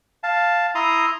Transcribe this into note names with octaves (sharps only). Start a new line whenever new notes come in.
F5 A5
E4 A#5 C6 D#6